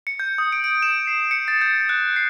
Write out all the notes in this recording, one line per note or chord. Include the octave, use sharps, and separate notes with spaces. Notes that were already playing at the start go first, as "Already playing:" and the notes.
C#7
G6
D#6
D7
D7
E7
C7
C#7
A6
G6
F#6
C7